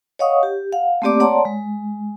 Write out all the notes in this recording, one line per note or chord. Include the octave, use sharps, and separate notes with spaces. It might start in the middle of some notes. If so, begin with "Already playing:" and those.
C#5 D#5 F5 F#5 C#6 D#6
G4
F5 F#5
A3 A#3 C4 G4 D5 D6
C#5 D5 F#5 A5 A#5 C6
G#3